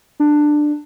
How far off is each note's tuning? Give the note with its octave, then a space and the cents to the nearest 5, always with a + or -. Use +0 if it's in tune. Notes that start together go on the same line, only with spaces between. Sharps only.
D4 +15